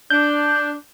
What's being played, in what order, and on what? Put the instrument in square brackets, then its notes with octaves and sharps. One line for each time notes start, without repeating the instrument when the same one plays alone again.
[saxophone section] D4 [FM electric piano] G6